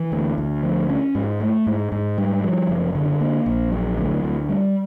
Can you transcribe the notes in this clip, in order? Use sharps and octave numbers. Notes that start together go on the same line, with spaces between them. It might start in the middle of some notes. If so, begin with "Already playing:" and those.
Already playing: E3
D2
D2
F3
C#4
G#2
A3
G#2
G#2
G3
F3
F#1
D3
A#3
A#1
F#3
D2
D2
G3